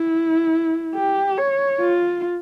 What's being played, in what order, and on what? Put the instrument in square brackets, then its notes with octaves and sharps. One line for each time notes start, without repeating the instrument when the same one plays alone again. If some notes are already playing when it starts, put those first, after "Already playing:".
Already playing: [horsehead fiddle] E4
G4
C#5
F4